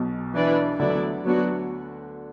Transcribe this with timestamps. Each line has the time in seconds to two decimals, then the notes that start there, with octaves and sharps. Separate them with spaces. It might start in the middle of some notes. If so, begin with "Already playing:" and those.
Already playing: B1 B2
0.34 E3 D4 B4 D5
0.79 D2 D3 F#3 B3 E4 D5
1.24 F#3 B3 D4 F#4